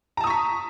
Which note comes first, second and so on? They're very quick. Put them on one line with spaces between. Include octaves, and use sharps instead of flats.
A#5 A5 D#6 C#6 B6